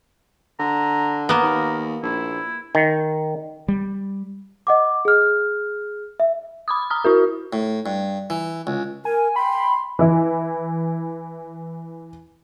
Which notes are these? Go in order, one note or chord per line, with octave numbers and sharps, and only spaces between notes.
D3 A#5
A#3 B3 A#4
D#2
A#1 E4
D#3
G3
D#5 F#5 D6
G#4 F6
E5
B5 D6 D#6
A#5 D#6 F6
E4 F#4 A#4
A2
G2
E3
C#2
A#4 G#5
G5 B5 C6
E3 E4